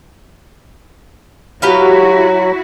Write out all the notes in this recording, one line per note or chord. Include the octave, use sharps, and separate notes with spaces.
F#3 E4 F#4 G4 B4 F5